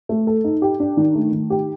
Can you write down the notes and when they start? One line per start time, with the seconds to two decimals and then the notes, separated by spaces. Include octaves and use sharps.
0.09 A3
0.27 A4
0.44 D#4
0.62 G4
0.80 D4
0.97 D#3
1.15 A3
1.32 D#3
1.50 G4